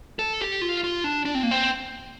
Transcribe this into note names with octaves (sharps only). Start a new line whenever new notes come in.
A4
G4
F4
F4
D4
D4
C4
A#3
C4